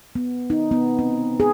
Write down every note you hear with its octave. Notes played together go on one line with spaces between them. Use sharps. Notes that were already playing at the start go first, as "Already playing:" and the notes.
B3
D#4
B3
C4
G#4